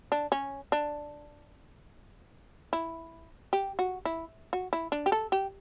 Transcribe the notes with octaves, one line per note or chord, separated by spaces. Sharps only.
D4
C#4
D4
E4
G4
F#4
E4
F#4
E4
D4
G4
A4
G4